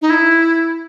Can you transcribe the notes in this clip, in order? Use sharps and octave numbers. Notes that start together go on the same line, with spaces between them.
D#4
E4